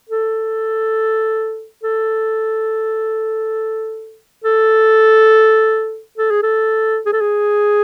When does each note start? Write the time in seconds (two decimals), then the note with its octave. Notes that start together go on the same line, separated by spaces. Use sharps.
0.10 A4
1.84 A4
4.44 A4
6.18 A4
6.31 G#4
6.43 A4
7.06 G#4
7.13 A4
7.21 G#4